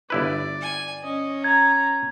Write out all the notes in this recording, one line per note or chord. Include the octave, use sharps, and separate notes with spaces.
G1 E4 B4 D5
G#5
C#4 D#5
A#5 G#6